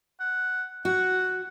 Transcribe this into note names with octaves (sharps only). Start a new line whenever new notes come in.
F#5
F#4 F#5